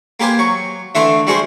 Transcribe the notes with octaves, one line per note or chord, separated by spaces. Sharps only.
A#3 G4 B4 C5 G#5
F#3 C#6
D3 E3 A3 E5 C6 D6
G3 F#4 G#4 C5